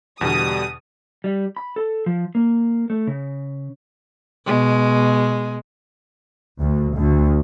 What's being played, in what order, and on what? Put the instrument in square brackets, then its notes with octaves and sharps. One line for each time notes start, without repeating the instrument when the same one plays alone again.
[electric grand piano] E2 B2 D3 [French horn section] G3 [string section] D#6
[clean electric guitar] G3
B5
A4
F3
A#3
A3
C#3
[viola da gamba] B2 G#3
[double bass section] D2
D2